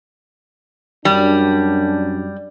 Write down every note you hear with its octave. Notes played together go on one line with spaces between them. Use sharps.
F#2 G3 D4